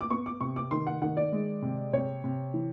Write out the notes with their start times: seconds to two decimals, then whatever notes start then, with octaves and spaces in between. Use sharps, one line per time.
0.01 D6
0.10 B3 C#6
0.26 D6
0.41 C3 C#6
0.56 D6
0.71 D#3 C6
0.87 F#5
1.02 D#3 F#5
1.17 D5
1.32 G#3
1.62 C3
1.93 C3 C#5
2.24 C3
2.54 E3